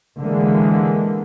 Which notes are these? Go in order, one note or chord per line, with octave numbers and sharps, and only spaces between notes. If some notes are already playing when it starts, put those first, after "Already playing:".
D3 E3 G#3 A#3